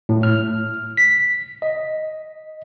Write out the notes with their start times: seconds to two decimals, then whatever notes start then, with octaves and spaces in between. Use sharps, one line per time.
0.09 A2
0.23 F6
0.97 B6
1.62 D#5